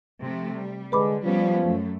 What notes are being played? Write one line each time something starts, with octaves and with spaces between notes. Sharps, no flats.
C3 F3 A3
G3
D3 G#3 B4 B5 D6
F3 G3 B3 C#4
F#2 A3